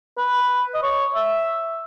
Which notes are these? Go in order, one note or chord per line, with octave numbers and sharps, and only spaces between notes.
B4
D#5
C#5
E5